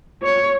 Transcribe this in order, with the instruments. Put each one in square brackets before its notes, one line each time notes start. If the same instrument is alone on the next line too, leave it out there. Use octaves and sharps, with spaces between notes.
[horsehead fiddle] C#5